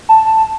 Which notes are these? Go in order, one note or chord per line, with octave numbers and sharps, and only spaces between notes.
A5